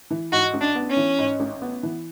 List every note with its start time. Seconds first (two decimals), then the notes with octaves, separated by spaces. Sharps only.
0.11 E3
0.32 G#2 F#4
0.54 A1
0.61 D4
0.75 B3
0.90 C#4
0.97 E3
1.19 G#2
1.40 A1
1.62 B3
1.83 E3